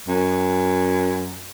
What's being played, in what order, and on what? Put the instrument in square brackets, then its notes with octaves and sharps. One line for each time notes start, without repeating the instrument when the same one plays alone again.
[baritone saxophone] F#2